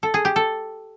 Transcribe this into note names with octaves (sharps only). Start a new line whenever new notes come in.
A4
G#4
G4
A4